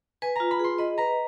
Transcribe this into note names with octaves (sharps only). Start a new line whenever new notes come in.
B4 G#5
F4 A#5
B5
G#4 C6
D#5 B5
B4 A#5